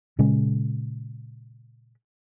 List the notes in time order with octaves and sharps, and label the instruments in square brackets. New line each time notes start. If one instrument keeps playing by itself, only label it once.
[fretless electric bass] A#2 C#3 G#3 C#4